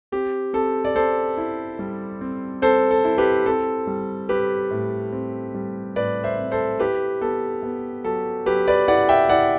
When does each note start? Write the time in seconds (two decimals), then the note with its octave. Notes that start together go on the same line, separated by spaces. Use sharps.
0.12 C4 G4
0.53 C4 A4
0.85 D5
0.95 C4 A4 C5
1.37 E4
1.79 G3
2.21 C4
2.62 C4 A4 C5
2.91 A4
3.04 E4
3.18 G4 B4
3.46 C4 A4
3.87 G3
4.29 G3 G4 B4
4.71 A2
5.13 C4
5.55 G3
5.96 A2 B4 D5
6.24 C5 E5
6.38 C4
6.51 A4 C5
6.80 E4 G4 B4
7.21 B3 A4
7.63 B3
8.05 F#3 A4
8.46 F#3 G4 B4
8.68 B4 D5
8.88 E4 D5 F#5
9.09 E5 G5
9.29 E4 D5 F#5